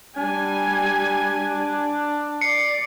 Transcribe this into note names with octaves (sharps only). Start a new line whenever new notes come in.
G3 D4 G#5
D5 C7 C#7